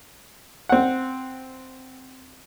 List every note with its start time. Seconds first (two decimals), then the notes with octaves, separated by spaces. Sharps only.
0.69 C4 F#5